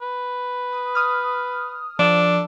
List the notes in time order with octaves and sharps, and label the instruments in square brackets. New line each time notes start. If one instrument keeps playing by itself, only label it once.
[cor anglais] B4
[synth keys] D#6
D#6 F6
[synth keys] F3 [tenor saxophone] D4 [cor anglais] A4